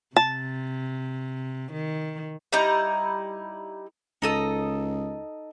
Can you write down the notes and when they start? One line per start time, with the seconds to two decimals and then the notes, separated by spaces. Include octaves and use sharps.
0.17 C3 A5
1.73 D#3
2.52 G3 D#4 E4 A#5
4.22 C#2 D#4 A4 D#5